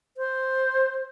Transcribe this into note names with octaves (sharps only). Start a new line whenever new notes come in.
C5